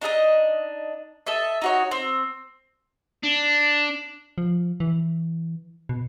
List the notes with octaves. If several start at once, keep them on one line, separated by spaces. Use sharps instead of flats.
D4 D#4 A4 D#5
A4 D#5 E5
D#4 F#4 C#5
C4
D4
F3
E3
B2